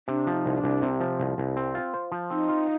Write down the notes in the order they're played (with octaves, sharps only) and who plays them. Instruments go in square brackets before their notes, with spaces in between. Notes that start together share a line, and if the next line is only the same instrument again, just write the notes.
[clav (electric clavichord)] C3 [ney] D4
[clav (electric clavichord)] F3
[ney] D#4
[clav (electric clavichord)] C2
[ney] D4
[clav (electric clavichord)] C2
C3
F3
C2
C2
C4
F4
C5
F3
[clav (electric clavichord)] C4 [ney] D#4
[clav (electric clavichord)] F4